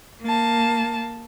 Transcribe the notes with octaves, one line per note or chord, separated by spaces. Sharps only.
A#3 A5